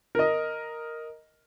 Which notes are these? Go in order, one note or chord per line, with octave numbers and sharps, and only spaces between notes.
A#4 D#5